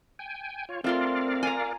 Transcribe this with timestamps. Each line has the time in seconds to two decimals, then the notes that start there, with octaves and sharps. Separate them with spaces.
0.19 G5 G#5
0.69 F4 C#5
0.84 A3 C4 F4 A#4 D5 F5 C6
1.43 G#5 A#5